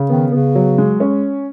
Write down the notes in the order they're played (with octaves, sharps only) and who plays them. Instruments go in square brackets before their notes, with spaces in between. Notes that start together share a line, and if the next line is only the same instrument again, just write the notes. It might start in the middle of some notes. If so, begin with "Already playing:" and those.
Already playing: [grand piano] C#3
[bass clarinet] D#3 [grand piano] B3
[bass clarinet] C#3 [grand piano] B3
[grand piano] F#3
G#3
C#4